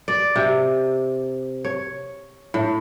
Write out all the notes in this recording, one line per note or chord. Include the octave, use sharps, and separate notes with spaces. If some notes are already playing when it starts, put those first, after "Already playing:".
D5
C3
C#5
A2